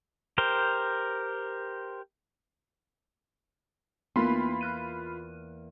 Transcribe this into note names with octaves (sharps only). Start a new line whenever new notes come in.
G4 A#4 C5
E2 A#3 B3 F4 B4 B5 C6
F6 F#6 D#7